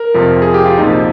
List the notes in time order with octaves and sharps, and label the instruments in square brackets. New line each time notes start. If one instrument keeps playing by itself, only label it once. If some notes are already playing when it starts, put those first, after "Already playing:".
Already playing: [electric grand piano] A#4
F2 C3 F3
G#4
G4
F4
C2 A#2 F3 D#4